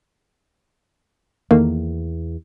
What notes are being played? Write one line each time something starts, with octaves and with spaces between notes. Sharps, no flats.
E2 D#3 A3 A#3